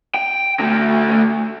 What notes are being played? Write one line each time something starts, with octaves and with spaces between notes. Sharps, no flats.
G5
D3 A3